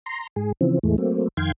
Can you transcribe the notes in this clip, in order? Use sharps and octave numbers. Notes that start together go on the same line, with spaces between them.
A#5 C6
G#2 G#4
C#3 E3 F3 C4
E2 A2 E3 G#3 A3
F#3 A3 A#3 C4
F2 D#3 F5 G5 C6 G#6